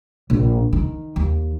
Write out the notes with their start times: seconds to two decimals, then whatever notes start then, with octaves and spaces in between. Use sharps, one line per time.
0.30 A#1
0.73 D#3
1.16 D#2